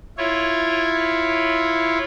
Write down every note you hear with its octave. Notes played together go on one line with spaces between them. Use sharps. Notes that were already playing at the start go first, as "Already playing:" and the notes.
E4 F4 C#5